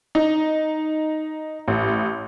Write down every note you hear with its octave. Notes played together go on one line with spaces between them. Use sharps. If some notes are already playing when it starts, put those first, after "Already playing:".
D#4
A1